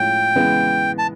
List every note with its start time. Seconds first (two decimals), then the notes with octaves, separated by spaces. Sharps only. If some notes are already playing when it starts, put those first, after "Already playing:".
Already playing: A2 F3 G#3 C#4 G5
0.35 C#3 E3 G#3 B3
0.98 A5